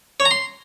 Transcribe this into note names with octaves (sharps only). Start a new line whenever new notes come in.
C#5
A#5
C6